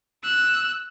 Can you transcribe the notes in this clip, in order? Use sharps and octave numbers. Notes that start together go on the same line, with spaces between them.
E6 F#6